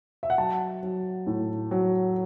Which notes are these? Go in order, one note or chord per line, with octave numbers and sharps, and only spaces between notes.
E5
F#5
F#3 A5
F#3
A2
F#3